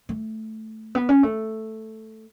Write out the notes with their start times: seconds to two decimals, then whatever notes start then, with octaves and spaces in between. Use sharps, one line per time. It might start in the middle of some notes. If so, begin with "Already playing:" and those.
0.09 A3
0.95 B3
1.09 C#4
1.23 A3